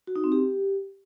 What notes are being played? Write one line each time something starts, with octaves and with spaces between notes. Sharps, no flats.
F#4
D#4
C4
G4